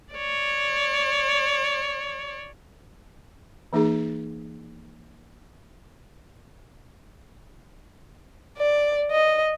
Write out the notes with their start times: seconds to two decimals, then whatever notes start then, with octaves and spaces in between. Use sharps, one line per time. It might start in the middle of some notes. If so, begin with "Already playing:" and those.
0.14 C#5 D5
3.73 E3 A#3 D#4 G#4
8.58 D5
9.12 D#5